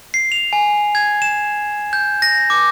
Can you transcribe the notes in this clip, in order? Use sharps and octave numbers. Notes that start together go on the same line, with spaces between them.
C7
F7
G#5
G#6
E7
G6
A#6
D6